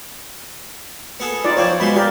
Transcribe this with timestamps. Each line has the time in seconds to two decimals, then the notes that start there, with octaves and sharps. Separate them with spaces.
1.20 B3 G#4 A4
1.45 D#4 F4 D5
1.57 F3 C4 C#5 D5 G5
1.80 B2 G#3 B5 C6
1.96 G4 A#4 D5 F5